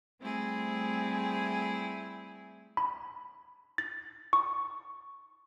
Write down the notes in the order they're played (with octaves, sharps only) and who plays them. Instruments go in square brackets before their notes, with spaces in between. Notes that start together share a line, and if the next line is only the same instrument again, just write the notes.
[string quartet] G3 A3 C4 E4 G#4
[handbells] B5
A6
C#6